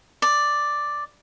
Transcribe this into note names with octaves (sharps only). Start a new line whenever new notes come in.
D5